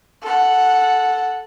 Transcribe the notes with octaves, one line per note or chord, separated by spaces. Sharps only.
A4 F#5